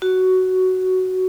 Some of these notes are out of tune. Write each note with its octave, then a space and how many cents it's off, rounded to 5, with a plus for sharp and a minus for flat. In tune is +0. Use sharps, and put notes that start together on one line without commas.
F#4 +10